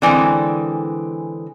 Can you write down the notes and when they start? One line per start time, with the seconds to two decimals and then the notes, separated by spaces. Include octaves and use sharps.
0.02 D3 E3 G#3 C4